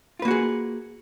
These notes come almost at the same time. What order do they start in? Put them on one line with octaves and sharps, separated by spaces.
F4 B4 A#3 F#4 G#4